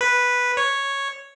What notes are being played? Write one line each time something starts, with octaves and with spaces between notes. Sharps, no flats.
B4
C#5